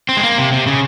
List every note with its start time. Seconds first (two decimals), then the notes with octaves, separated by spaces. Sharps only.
0.09 C4
0.17 G#3
0.23 A#3
0.38 C3
0.52 C3
0.66 C#3